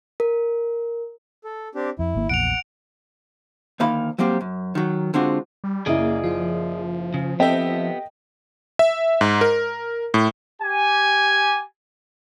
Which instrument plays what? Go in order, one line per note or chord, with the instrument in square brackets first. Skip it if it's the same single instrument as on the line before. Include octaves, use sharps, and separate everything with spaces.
[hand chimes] A#4
[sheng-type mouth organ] A4
C4 D4 G4
[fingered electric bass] F2 [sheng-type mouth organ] E4
[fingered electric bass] G#1 D#3 A#3
[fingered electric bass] A#1 E2 A#2 [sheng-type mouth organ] F#5 [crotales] D7 F7
[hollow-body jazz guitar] D2 D#3 A#3 D#4 F5 B5
F#3 G3 A#3 C4 G4
F#2
D#3 F#3
D3 G#3 C4 D4 F4 F#4
[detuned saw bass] G3
[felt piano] F#1 E4 [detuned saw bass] A#3 [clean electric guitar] G#4 D5 D#5
[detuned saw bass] F3 [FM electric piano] F4
[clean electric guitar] C#3
[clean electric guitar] B3 G4 [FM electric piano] C4 A4 E5 [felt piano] D#5 G5
[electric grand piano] E5
G#2
A#4
A2
[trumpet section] G4 G#5